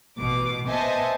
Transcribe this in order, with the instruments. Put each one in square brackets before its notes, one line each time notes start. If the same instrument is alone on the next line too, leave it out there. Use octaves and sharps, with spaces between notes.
[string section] A1 B2 D6
B3 C5 D#5 E5 G#5 A5